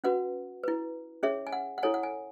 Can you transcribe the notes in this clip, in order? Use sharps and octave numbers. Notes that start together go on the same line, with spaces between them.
C#4 F#4 B4 F#5
E4 B4
C#4 G#4 C#5 E5
G#5
F#5
F#5
E4 A4 C#5 G#5
F#5
G#5